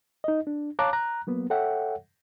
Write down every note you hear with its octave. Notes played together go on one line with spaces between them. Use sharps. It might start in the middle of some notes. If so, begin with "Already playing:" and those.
D#4 D#5
D4
C#5 F5 A5 A#5 D6 F#6
A#5 F#6
F#3 A#3 B3
A4 C#5 E5 F#5 G5